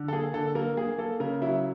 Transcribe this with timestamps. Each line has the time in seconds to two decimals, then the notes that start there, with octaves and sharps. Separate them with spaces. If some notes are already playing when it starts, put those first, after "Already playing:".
Already playing: D3
0.08 A4
0.13 A#3 G#4
0.34 D3 A4
0.55 A#3 A#4
0.77 A#3 G#4
0.98 A#3 A4
1.20 C#3 A#4
1.42 F#3 E4